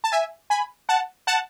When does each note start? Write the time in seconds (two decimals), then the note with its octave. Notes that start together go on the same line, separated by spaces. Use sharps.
0.04 A5
0.12 E5 G#5
0.50 G#5 B5
0.89 F#5 A5
1.27 F#5 A5